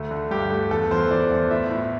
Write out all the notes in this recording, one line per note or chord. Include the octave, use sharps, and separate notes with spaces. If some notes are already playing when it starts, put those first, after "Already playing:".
Already playing: D2 A3
D3
G2 G4
A3
E2 A4
E2 C5
E3 D5
E2
A2 E5
A2